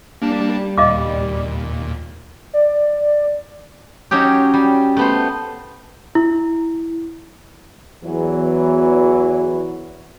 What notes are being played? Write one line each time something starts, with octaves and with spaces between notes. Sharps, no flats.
G3 A#3 D4 A5
D#2 A#2 D#5 F5 D6
D5
F#3 C#4 D#4 G4
G3
A3 B3 C5
E4
E2 E3 F#3